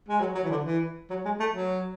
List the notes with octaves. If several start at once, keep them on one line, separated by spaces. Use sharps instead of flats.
G#3
F#3
F#3
E3
D3
E3
F#3
G#3
A3
F#3